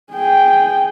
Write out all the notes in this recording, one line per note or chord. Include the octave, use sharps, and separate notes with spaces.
G#4 G5